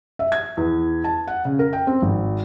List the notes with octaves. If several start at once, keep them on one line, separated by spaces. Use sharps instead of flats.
E5
G#6
E2
A5
F#5
C#3
A#4
G5
C4
G#1